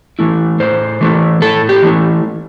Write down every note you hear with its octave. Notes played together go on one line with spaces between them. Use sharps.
E3 A3 E4
A2 C5
E3 A3 E4
A2 A4
G4
E3 A3 E4